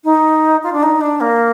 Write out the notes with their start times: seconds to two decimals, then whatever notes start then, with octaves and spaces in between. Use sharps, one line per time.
0.04 D#4
0.63 F4
0.72 D4
0.83 D#4
1.01 D4
1.20 A#3